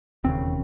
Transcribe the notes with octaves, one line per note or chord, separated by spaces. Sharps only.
E1 D#2 C#3 C4